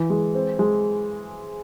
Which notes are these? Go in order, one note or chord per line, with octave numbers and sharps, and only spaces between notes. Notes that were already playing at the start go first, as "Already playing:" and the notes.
Already playing: E3
G#3
C4
G#3